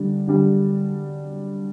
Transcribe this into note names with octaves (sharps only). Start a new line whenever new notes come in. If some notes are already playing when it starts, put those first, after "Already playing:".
Already playing: D3 G3 D4
D3 G3 D4